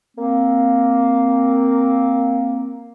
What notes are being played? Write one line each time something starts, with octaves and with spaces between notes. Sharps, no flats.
A#3 C4